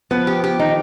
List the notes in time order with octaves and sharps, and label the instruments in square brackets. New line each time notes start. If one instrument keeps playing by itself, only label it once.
[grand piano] F3 [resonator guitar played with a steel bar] B3
[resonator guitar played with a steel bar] G4
G4
[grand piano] D#3 [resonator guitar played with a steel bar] D#4